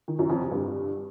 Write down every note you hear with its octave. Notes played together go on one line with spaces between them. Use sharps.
D#3
F#2
F2
C3
G2